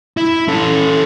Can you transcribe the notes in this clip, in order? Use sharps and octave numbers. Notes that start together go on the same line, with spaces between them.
E4
C#4 A4